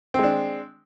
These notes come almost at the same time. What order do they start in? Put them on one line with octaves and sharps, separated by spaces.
C4 G#3 D4